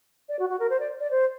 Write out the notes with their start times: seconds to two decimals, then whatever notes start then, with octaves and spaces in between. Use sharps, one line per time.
0.29 D5
0.39 F#4
0.49 F#4
0.59 A#4
0.70 C5
0.79 D5
1.00 D5
1.10 C5